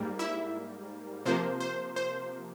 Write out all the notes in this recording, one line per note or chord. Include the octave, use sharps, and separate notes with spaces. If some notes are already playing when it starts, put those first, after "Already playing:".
Already playing: G#2 G3 A#3
E4 E5
C3 F3 A#3 C5
C5
C5